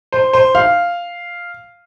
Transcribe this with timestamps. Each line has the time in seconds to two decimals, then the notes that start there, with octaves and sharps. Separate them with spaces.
0.12 C5
0.33 C5
0.55 F5